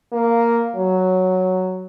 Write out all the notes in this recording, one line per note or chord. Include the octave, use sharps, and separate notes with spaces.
A#3
F#3